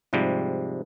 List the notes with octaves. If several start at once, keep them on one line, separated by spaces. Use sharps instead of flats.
G#2 C3 F3 G3